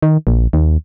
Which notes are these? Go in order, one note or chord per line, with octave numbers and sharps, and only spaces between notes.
D#3
A#1
D#2